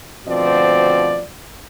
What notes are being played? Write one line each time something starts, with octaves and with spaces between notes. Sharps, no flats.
D2 B2 F3 C4 F#4 D5